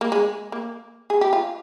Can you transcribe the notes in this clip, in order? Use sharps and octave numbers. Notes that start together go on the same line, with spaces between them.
A#3
G#3
A#3
G#4
G4
F4